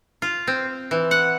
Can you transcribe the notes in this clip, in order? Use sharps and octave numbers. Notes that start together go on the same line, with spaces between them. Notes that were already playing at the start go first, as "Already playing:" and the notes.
F4
C4
E3
F#5